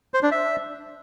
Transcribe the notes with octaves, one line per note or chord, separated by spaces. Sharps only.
C5
D4
E5